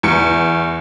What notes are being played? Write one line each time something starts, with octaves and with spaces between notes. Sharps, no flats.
E2 C#7